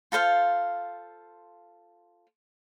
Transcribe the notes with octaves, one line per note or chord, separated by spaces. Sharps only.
F4 A4 C5 F5